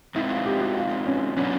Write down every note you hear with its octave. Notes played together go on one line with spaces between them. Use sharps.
B2 G#3 C4 D#4 E4
F4
G4
F#4
F4
C#4
F#3 B3 C#4 D4